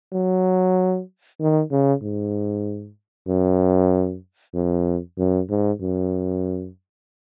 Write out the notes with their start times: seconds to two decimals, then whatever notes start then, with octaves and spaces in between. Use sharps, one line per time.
0.13 F#3
1.40 D#3
1.71 C#3
2.02 G#2
3.28 F#2
4.55 F2
5.18 F#2
5.50 G#2
5.80 F#2